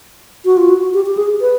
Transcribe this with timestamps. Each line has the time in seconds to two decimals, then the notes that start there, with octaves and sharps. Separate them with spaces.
0.45 F#4
0.57 F4
0.69 F#4
0.94 G4
1.06 G4
1.17 G#4
1.41 B4